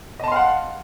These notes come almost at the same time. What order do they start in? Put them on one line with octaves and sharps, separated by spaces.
D#5 A5 C6 F5 F#5